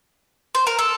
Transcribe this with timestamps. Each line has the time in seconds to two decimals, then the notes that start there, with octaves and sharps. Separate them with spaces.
0.55 C5
0.67 A#4
0.78 A4